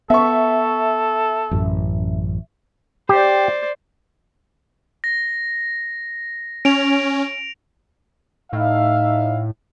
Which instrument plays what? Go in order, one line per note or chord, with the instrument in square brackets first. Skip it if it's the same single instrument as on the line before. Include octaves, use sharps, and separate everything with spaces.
[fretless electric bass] B3 [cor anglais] A4 [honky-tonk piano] E5 C#6
[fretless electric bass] A1 F#2
[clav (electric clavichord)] G4 [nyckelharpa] C5 D5
[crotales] A#6
[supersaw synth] C#4 [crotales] D7 F7
[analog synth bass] A2 [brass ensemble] D#4 E5 F5